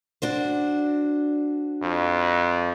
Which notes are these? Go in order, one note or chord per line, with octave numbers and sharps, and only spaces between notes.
D4 F#4 C5
F2